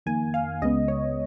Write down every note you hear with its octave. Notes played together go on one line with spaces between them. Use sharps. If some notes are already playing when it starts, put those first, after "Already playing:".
F2 D#3 A#3 G#5
F5
C#2 C#3 G#3 B3 D#5
C#5